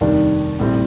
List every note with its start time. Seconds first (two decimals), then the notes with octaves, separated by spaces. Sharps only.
0.01 F1 D#2 D#3 G3 D4
0.59 A#1 A2 G3 C4